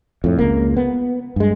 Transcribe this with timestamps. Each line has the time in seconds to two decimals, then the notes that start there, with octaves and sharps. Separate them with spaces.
0.24 F2 A2
0.39 C#2 A#3
0.77 B3
1.36 G2 G#3